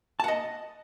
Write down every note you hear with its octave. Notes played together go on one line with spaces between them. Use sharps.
D#5 F#5 A5